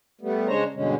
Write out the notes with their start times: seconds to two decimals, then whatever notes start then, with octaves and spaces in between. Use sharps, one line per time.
0.21 G3 A3 B3
0.48 C#3 G#3 D4 C5 C#5 A#5
0.74 G2 B2 D3 G#3 C#4